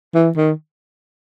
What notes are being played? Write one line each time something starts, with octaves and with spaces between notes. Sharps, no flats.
E3
D#3